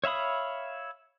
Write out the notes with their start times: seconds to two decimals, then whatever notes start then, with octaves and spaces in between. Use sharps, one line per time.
0.04 C#5 E5 F5 B5 D#6